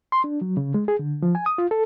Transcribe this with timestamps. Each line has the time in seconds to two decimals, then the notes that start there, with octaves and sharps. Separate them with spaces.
0.12 C6
0.24 D4
0.41 F#3
0.57 C#3
0.74 G#3
0.88 G#4
0.99 D3
1.22 F3
1.35 G#5
1.46 D#6
1.58 F4
1.71 A4